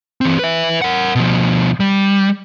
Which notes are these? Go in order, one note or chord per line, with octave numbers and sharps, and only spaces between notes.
E3 C4
B4 E5
A#4 F#5
B2 F3
G3